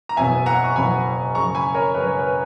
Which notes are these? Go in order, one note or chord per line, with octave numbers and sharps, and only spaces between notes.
A#5
F#1 E2 B2 F#3 B3 E5 G#5
F#5 A#5
C#6
F#1 E2 B2 F#3 B3 G#5 B5
F#2 C#3 G#3 A#5 C#6
G#5 B5
A#4 C#5
F#2 C#3 G#3 B4
C#5
B4